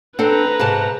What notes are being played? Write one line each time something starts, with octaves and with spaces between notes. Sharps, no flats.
C4 D4 A4 B4 A#5
G#2 C3 G#4 A5